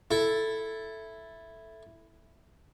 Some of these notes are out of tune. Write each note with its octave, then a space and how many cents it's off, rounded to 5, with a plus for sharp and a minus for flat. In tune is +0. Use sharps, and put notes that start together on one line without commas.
E4 +0 A4 +0